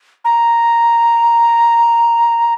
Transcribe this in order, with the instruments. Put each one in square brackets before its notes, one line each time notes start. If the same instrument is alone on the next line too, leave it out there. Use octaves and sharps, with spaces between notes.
[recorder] A#5